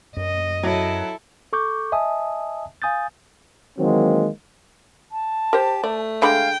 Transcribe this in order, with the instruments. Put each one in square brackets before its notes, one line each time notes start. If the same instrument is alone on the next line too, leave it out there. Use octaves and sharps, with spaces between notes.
[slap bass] F#2 [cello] D#5
[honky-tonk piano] F#3 [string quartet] E4 A4
[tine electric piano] A4 C#6 D6 G6
D#5 E5 G#5 A5 D#6
F5 G#5 D#6 G6 A6
[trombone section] D#3 E3 F#3 G#3 A#3 C4
[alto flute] A5
[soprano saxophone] G4 [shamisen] A#4 C5
[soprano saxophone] A3 [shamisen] D5
[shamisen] D3 G#3 B5 [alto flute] F5 [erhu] G5